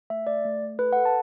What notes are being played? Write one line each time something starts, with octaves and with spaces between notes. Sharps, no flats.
A3 E5
A3 D5
A3
A3
A4 B4
A4 F#5
A5